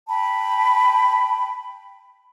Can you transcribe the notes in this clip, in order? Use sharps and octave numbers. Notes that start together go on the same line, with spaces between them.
G5 A5 B5